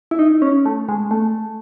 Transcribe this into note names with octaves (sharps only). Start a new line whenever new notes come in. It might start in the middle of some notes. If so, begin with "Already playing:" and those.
E4
D#4
C#4
A3
G#3
A3